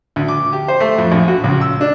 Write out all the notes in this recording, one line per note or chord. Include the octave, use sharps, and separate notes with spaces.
D2
D6
G4
C5
A3
F2
A#1
F#4
C#2
E6
D4